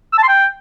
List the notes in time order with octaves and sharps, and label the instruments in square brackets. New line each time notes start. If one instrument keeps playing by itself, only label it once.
[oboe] E6
A5
C6
G5